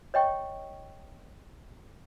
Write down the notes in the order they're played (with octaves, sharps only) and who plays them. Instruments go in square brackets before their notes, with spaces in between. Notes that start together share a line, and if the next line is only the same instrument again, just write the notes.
[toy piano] C#5 D#5 G5 C#6